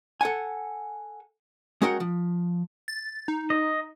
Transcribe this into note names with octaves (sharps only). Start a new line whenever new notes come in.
A4 F#5 G#5
G#3 C#4 F#4 A#4 F#5 G5
F3
A6
D#4
D#5